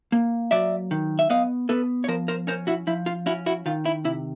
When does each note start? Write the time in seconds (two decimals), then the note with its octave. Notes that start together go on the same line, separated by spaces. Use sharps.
0.12 A#3
0.51 F#3 D5 E5
0.91 D#3
1.19 E5
1.30 B3 D#5 F5
1.69 B3 A4 B4
2.04 C#5
2.08 F3 A#4 C5
2.28 A#4 C5
2.47 C#4 A#4 C5
2.67 E4 F#4
2.87 F3 E4
3.06 F4
3.26 C#4 E4 F#4
3.46 E4 F#4
3.66 D#3 F4
3.85 E4
4.05 C3 E4